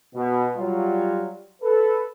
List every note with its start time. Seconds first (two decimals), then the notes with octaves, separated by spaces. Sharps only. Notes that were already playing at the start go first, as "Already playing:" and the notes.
0.15 B2
0.57 F#3 G3 F4
1.62 A4 B4